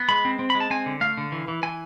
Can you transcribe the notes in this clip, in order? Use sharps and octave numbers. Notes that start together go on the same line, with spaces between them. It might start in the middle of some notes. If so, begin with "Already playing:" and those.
Already playing: B3
G#3 B5
C4
C4
B5
G#3
A5
C4 G#5
D3
A3 F5
D3
E3
E3
E3 G#5